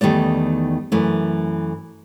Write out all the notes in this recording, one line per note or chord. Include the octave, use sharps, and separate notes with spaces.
E2 D#3 G3 A3 D5
F#2 E3 A3